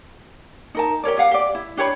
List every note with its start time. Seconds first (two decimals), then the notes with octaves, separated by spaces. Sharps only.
0.75 D#4 A#4 A5
1.04 G4 A#4 C#5 D5
1.18 G4 F5 F#5
1.31 G4 D5
1.55 E4
1.77 D4 G4 C#5 B5